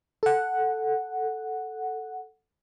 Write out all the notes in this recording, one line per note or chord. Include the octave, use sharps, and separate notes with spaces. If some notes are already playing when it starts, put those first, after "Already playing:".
A4 F#5